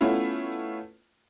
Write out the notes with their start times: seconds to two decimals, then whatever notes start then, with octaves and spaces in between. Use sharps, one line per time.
0.01 A3 B3 C#4 E4 F4